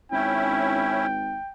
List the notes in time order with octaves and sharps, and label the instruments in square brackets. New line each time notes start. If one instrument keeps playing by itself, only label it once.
[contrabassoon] G#1 [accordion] C#4 E4 [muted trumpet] G5